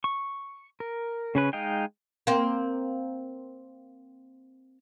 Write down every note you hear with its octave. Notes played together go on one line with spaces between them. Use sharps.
C#6
A#4
C#3 C#4 B4
G#3 D#4 D#5 F5 G5
A#3 C4